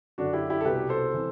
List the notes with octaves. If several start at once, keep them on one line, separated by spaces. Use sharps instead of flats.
F#2 D3 D4 F#4
E4 G4
E4 G4
A4
C2 B2 G4 B4
A4 C5
C3 E3